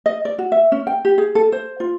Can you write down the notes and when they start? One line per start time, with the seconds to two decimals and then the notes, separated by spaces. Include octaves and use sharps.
0.06 D#5
0.25 D5
0.39 F#4
0.52 E5
0.72 C#4
0.87 G5
1.05 G4
1.18 G#4
1.35 A4
1.52 C5
1.80 F4